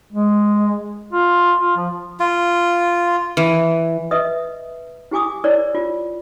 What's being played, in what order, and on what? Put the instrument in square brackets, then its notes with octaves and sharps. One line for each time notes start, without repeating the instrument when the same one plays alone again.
[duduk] G#3
F4
F4
F3
[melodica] F4
[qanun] E3
[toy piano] B4 D#5 E5 D#6
E4 G4 G#5 D6 D#6
E4 A#4 C#5 D5
F4